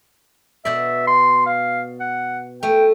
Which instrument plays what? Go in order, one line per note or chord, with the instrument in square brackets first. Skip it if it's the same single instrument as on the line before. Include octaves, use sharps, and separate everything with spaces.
[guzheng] B2 D5 [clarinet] E5
[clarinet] C6
F5
F#5
[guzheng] A3 [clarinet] G5